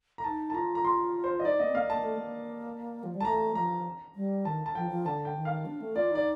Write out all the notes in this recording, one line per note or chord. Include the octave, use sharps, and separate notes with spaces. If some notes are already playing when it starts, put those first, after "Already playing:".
A#5
D#4 A5
A5
F4 A#5
A#5
C6
C5
D#5
D#4 D5
A#3 D#5
C4
A#3 F5
A#3 A5
A3
A#3
F3
G3
A5
A3 A#5
F3 A#5
G3
D#3 A5
A5
F3 G5
F3
D3 A5
G5
D#3
F5
D4
A3
F4 D5
D#4 D5